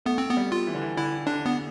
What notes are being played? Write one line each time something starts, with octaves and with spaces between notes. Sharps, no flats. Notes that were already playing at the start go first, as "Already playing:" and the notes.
A3 B3
C4
B3
G3
F4
E3
D3
E3
D3 E4
D3 D4
B3